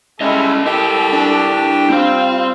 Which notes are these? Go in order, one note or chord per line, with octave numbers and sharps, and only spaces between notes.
G3 G#3 C#4 E4 A4 D#5
E4 G4 A#4 G5
D4
G3 C4 F4 C5